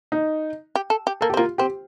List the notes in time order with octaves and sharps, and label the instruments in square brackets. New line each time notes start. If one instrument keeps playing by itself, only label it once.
[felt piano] D#4
[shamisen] G4
A4
G4
[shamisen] A#3 [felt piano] A4
[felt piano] G4
[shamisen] C4
[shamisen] A#3 [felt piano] F4
[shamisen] C4 [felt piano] G4